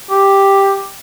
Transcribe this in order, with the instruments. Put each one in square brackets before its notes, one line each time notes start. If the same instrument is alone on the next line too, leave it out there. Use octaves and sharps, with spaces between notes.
[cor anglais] G4